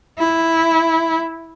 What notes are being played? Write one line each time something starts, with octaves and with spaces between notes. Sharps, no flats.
E4